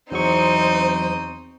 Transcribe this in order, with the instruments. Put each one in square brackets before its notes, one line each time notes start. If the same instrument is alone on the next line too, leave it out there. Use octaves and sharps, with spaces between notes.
[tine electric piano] E2 F#3 C#6 [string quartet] C4 D#4 D#5 [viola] C5